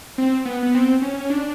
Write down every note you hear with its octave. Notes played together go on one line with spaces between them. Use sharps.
C4
B3
B3
C4
C#4
C#4
D4